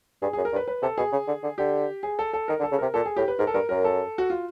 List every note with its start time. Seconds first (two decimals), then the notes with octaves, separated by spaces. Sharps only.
0.22 G2 G#4
0.33 F#2 G#4
0.45 A#4
0.53 G2
0.56 B4
0.68 B4
0.82 C3 A4
0.97 B2 G#4
1.12 C#3
1.28 D3
1.43 D3
1.58 D3 G4
2.03 G#4
2.19 A4
2.33 A4
2.48 D#3 A#4
2.60 D3
2.63 A4
2.72 C#3
2.79 C3 A#4
2.94 A#2 A4
3.06 G#4
3.16 A2 G4
3.28 B4
3.39 G#2 A#4
3.47 A4
3.54 G2 A#4
3.69 F#2 A#4
3.85 A4
4.18 F#4
4.30 F4